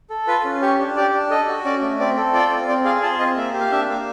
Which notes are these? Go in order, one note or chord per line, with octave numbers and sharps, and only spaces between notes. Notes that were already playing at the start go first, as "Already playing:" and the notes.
A4
F4 B4
C#4
G4 C#5
D4
G4 D5
D4
A4 D#5
F#4
C#4 D5
A3
C4 D5
A4
F4 D5
C4
C4 D5
G#4 F5
F4 A5
C4 D#5
A#3 E5
G4
F5
D4 E5
A#3